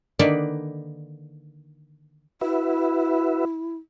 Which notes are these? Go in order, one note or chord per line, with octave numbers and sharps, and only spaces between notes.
D3 D#3 A#3 D4 D#4 B4
E4 F#4 B4 E5